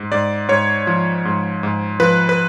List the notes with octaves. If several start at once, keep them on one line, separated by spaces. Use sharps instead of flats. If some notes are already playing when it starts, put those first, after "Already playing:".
Already playing: G#2
G#2 D5
G#2 C#5
F3
G#2
G#2
F3 B4
B4